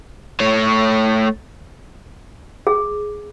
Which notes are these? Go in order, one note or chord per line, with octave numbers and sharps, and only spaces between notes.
A3 C#5
G#4